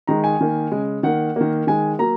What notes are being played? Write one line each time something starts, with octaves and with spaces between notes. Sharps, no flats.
D#3 G#3 A#5
G#5
D#3 A#3
C#3 G#3
D#3 A#3 F#5
D#3 A#3
D#3 G#3 G#5
F#3 A#3 A#5